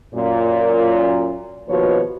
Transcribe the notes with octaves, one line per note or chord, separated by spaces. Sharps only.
F#2 A#2
D#2 B2 F3 F#4 B4 C#5